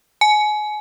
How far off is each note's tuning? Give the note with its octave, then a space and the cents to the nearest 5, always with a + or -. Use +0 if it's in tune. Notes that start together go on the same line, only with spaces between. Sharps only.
G#5 +30